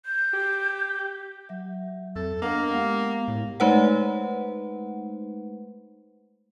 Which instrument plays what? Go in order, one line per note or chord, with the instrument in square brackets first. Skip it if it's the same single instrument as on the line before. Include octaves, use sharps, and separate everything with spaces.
[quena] G6
[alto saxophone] G4
[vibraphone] F#3 E5
[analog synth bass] F2 [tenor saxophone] A4
[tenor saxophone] A#3 [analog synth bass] B3 [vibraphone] D4 D#5
[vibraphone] G#3 G4 F5 [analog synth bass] B3
[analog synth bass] A2
[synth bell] G#3 A3 D#4 B4 C5 F#5